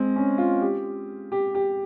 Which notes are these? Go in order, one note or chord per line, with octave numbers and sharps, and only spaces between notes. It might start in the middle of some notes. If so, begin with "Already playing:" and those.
Already playing: G#3 C4
C#4
F4
G4
G4
G4